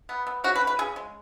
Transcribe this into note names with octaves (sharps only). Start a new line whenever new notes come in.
B3
B3
C#3 F#4
B4
C#3
B4
C#3 G#4
G#3